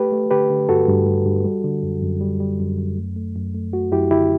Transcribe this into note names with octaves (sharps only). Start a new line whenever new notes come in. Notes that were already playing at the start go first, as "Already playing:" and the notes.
Already playing: A3 G4 B4
A3
D3 G4 B4
D3
G2 F#4 A4
G2
G2
G2
G3
D3
F#2
F#2
G3
G3
F#2
F#2
A3
A3
F#2
A3
A3 F#4
F#2 E4 G4
D3 E4 G4